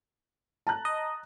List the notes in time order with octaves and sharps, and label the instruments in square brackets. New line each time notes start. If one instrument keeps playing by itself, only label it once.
[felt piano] A5 A#5 F#6
[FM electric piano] D#5